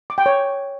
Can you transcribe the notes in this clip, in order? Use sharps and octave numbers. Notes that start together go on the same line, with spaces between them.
D6
G5
C#5